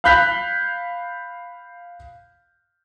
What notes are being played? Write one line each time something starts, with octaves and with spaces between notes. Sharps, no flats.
F5 B5 F#6 G6 B6 F7